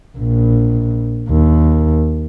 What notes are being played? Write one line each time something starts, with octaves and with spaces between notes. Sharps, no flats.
A#1
D#2